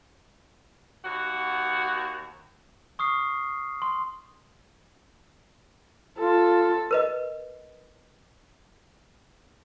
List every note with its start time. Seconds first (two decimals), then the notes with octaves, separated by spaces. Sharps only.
1.04 D#2 F#4
2.99 C#6 D#6 F6 C7
3.82 C6
6.19 F4 A4
6.91 A#4 B4 D#5